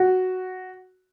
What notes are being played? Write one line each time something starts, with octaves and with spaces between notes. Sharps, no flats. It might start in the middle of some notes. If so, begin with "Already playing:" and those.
Already playing: F#4